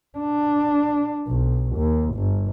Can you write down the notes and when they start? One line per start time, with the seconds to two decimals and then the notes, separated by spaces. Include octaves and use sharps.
0.18 D4
1.27 B1
1.76 D#2
2.15 G1